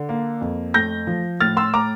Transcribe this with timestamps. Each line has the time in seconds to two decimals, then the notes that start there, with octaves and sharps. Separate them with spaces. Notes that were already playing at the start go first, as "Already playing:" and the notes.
Already playing: D3
0.09 A#3
0.41 F2
0.74 A3 G6 A#6
1.07 F3
1.41 A2 F6 A6
1.57 C6 E6
1.74 A2 A#5 D6